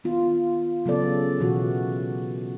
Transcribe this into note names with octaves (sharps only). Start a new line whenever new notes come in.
D#3 B3 F4
C#3 F#3 B3 C#4 A4 D5
B2 E3 F#4